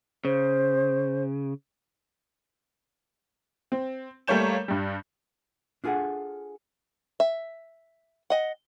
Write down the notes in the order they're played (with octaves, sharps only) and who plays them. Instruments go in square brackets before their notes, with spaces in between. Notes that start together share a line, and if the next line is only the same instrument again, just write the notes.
[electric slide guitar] C#3 [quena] C5
[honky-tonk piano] C4
G3 A3 A#3 C#5 G6 E7
G2 G3
[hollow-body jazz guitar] D4 F4 G#4 A4 F#5
[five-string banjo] E5
D#5 F#5